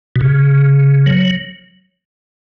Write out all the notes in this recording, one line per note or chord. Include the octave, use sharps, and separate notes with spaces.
B2
C#3
F#3